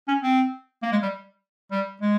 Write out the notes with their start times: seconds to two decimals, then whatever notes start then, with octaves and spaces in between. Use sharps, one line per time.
0.08 C#4
0.23 C4
0.83 A#3
0.92 G#3
1.03 G3
1.72 G3
2.01 G#3